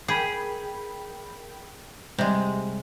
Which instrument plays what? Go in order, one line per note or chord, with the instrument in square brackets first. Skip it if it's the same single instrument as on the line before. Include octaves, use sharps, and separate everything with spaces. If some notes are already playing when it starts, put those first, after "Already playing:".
[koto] G#4 [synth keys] A#4 G5 B5
[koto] C3 G#3 [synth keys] G3